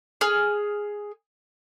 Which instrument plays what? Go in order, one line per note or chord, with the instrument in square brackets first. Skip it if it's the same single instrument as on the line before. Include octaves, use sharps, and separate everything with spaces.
[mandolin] G#4 F6